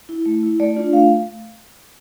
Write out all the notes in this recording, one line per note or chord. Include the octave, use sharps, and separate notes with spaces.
E4
A3
E4
A3 D5
D4 F4
A3 F5